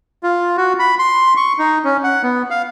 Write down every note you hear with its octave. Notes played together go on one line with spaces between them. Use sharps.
F4
F#4
B5
C6
C#6
D#4
C#4
F#5
B3
F5